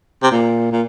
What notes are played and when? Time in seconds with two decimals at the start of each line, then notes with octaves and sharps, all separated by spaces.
0.23 C3
0.31 A#2
0.72 A#2